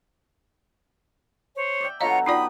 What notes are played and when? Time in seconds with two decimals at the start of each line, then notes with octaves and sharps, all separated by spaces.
1.56 C5 C#5
1.80 D5 E5 G5
2.01 B2 D3 F#3 F4 C#5 D#5 F5 A#5
2.26 D#4 F4 D5 G5 B5 D#6